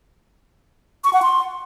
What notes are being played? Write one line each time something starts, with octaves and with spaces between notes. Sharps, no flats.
C#6
F#5
C6